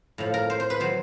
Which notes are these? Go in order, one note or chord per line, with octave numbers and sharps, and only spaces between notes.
A2 F3
A#4
C5
C5
B4
D#3 F#3 C5